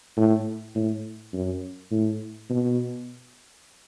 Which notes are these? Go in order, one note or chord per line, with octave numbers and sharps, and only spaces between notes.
A2
A2
F#2
A2
B2